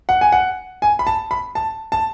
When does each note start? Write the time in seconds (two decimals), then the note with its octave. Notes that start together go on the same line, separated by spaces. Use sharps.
0.09 F#5
0.21 G#5
0.32 F#5
0.82 G#5
0.99 B5
1.07 A5
1.31 B5
1.55 A5
1.92 A5